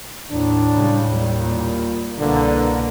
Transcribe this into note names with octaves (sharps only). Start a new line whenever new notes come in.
D#2 A2 D4
C#3 G3
D#2 G3
A#2
C2 B2 D3 A#3